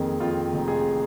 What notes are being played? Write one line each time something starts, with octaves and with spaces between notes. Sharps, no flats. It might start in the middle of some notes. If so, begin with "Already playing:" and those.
Already playing: F2 D#3 A#3 G#4
F2 F4
F1
G#4